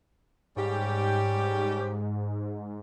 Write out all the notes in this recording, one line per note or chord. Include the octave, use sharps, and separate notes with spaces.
G#2 G3 C#4 G4